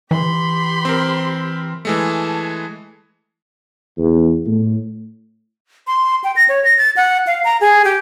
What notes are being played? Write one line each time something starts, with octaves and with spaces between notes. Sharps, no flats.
E3 G4 B5 C6
C4 A#4
E3 G#3 A3 A5
E2
A2
C6
G5
A#6
C#5
A#6
A6
F#5
F5
A#5
G#4
G4